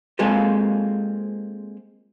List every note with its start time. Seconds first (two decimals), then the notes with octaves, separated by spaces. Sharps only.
0.19 G#3 A#3 C4 F4 G4 A4